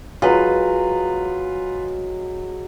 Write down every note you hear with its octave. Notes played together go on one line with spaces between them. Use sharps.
F#3 G#3 F4 B4